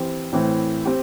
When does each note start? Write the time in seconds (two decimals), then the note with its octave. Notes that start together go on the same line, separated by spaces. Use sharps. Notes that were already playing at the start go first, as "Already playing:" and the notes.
Already playing: E3 C4 G4
0.33 A2 E3 C4
0.85 C4 G4